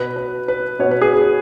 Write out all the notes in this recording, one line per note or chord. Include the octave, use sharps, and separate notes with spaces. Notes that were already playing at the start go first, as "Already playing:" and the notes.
Already playing: B2 B3 B4
B4
B4
B2 B3 C#5
B4
G#4
B4